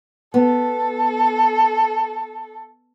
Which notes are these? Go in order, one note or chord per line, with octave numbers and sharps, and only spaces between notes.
B3 A4